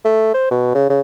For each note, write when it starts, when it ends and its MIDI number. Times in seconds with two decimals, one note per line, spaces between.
0.05 0.34 57
0.34 0.49 72
0.51 0.74 47
0.75 0.89 49
0.90 1.00 49